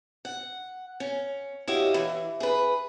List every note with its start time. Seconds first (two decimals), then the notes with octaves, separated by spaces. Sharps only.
0.25 F#5
1.00 C#4
1.67 E4 F#4 G4 C#5 D#5 F5
1.94 E3
2.40 G#4 B4